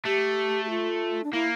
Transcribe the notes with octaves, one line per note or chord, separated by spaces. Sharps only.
A3 G4
G4
F4
D4
A#3 E4